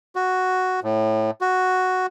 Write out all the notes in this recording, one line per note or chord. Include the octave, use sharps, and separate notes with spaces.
F#4
A2
F#4